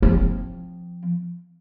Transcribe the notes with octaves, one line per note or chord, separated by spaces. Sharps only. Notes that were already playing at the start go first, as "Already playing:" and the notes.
F3 C4